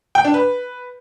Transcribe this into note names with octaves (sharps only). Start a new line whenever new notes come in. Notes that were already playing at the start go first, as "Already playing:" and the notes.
G5
D4
B4